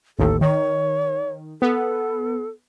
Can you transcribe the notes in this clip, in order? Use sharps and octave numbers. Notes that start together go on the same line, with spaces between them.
A1 D#2 A4
D#3 C#5
B3 A4